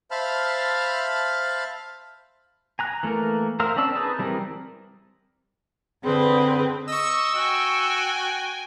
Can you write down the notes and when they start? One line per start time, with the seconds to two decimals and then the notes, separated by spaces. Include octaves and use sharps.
0.11 C5 E5 F5 A5 B5 F6
2.79 G#5 A#5 F#6
3.03 E3 A3 A#3 A#4
3.60 A#4 C5 E5 F5
3.76 C4 C#4 D5 A5 E6
3.95 D#4 G#4 B4 A5
4.19 E3 G3 C4 E4 A#4
6.04 D3 C4 G#4 B4
6.87 D#5 C#6 E6
7.35 F#4 G5 G#5